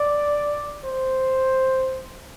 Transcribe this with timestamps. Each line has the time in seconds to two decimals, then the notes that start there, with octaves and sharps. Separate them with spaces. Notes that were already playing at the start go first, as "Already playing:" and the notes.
Already playing: D5
0.84 C5